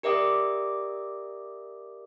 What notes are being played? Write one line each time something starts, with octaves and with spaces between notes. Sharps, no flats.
G4 A#4 D5 E5 D6 D#6